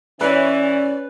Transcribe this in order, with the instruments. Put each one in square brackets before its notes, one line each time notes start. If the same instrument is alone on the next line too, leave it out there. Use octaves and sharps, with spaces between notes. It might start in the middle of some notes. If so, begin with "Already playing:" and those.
[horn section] E3 [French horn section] C#4 [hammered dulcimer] B4 [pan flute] D5